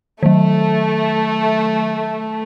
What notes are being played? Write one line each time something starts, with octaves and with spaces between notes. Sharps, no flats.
D#3 F#3 A3